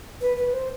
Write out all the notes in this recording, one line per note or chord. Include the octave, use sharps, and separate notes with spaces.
B4
B4
C5